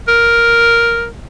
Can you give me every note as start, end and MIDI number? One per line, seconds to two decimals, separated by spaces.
0.08 1.07 70